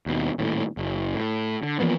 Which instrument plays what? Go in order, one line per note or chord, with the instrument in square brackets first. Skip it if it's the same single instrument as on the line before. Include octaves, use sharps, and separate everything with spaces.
[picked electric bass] D#2 B2
D#1 D#2 A2
F#1
A2
D3
E3 F3 A#3 B3